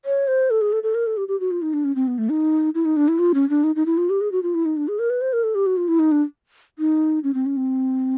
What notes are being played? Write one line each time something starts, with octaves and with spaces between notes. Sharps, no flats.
C#5
C5
A4
G#4
A4
A4
A#4
A4
G4
G4
F#4
F4
D#4
D4
C#4
C4
B3
A3
D#4
E4
D#4
D4
E4
F4
C#4
D4
D#4
D#4
E4
F4
G4
G#4
F#4
F4
E4
D#4
D4
G#4
A#4
B4
C5
A#4
A4
G4
F#4
F4
E4
D#4
D4
D#4
C#4
C4
C#4
C4